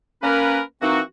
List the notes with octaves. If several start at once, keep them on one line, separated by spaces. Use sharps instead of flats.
A#3 C#4 A#4 B4
E3 A#3 C4 D#4 F#4